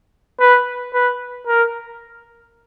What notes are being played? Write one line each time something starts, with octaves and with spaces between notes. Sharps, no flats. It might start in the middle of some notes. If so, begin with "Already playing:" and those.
B4
B4
A#4